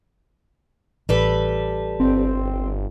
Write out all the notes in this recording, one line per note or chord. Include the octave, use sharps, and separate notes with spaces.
A1 G3 A4 B4
G1 C4